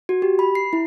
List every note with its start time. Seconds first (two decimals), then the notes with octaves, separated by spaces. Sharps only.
0.09 F#4
0.22 G4
0.39 B5
0.55 C7
0.73 E4